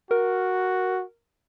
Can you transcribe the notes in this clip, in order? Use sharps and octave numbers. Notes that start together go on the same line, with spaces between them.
F#4 A#4